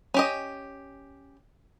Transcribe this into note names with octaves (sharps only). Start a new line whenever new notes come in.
C#4 G4 D#5